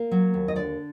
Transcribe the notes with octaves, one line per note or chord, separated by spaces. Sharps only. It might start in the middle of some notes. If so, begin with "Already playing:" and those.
Already playing: A#3
F#3
D#2
D#5
D3 D5